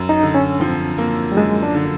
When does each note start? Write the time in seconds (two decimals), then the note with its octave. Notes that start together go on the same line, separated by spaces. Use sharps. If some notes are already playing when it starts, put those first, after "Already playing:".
Already playing: F#2
0.09 D#4
0.23 D3
0.35 C#4
0.60 F3 C4
0.98 A#3
1.32 G3
1.37 F#2 G#3
1.63 D4
1.75 D3